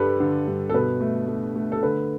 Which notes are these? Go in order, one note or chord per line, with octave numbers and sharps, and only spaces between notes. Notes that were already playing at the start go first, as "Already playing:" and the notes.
Already playing: G2 G3 G4 A4 B4
D3
G2
A4
B2 B4
A3
A3
A3
A4
D3 B4